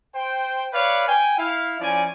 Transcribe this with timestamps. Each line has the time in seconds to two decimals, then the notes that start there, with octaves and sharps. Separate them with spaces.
0.15 C5 G5
0.73 B4 C#5 D5 F5
1.08 G5 G#5
1.39 E4 F5
1.80 F3 C#4 E4 D5 G#5